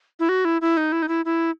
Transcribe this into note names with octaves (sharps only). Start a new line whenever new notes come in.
E4
F#4
E4
E4
D#4
E4
D#4
E4
E4